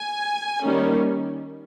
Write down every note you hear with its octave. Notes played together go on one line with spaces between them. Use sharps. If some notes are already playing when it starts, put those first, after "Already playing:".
Already playing: G#5
D#3 G3 A#3 C#4